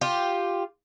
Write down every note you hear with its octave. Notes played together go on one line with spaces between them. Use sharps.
F4 G4